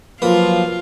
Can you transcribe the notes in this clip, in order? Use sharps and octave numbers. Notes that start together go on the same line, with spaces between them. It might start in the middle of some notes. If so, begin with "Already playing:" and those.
F3 F#3 A#3 F4 B4